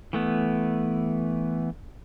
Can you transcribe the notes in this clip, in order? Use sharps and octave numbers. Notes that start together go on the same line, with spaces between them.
E3 A3 B3